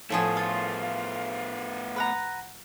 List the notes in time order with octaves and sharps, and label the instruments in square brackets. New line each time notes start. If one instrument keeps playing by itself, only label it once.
[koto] A2 F3 G#4 [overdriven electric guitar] A3 B3 [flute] F5
[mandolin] F4
B4 F#5 A#5